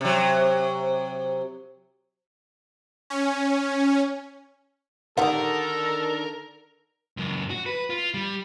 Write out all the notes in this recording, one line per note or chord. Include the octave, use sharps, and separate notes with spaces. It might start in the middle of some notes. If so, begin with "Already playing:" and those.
C3 F#3
C#4
D3 D#3 G4 A4 A#4 F#5
C#2 F#2
F#4
B4
F4
G3